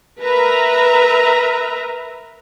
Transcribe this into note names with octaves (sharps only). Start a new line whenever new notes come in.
A#4 B4 E5 A#5